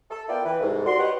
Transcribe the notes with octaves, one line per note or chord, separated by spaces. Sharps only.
A4
B3 E4 F4 A#4 D5 G5
E3 B4
C2 G#2
F#4 D5 C6
G4 B4 C#5 D#5 F#5